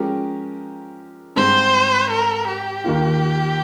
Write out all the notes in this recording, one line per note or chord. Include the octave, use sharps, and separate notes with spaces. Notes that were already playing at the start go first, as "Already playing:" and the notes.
Already playing: F3 G#3 C#4 G4 A#4
G#2 G3 C4 C5
A#4
G4
D#2 D#3 A#3 F4